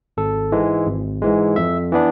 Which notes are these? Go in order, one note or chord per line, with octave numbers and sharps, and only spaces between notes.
G#1 A4
G#2 E3 G#3
G#1
G#2 E3 G#3
F2 E5
E3 B3 D4